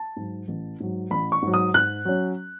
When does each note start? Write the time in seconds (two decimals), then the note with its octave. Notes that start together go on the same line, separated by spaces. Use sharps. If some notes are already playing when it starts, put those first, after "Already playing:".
Already playing: A5
0.16 G#2 F#3
0.48 A1
0.80 G#2 F#3
1.11 A1 B5
1.32 C#6
1.42 G#2 F#3
1.54 D#6
1.74 G#2 F#6
2.05 F#3 C#4